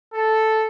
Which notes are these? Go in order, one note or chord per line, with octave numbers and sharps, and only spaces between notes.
A4